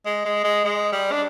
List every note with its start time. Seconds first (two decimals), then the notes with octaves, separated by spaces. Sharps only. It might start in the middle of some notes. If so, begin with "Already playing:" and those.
0.06 G#3
0.25 G#3
0.44 G#3
0.64 G#3
0.92 G3
1.12 D4